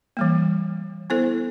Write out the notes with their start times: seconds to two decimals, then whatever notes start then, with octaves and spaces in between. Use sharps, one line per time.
0.17 E3 G3 A#3
1.10 B3 E4 A4 C5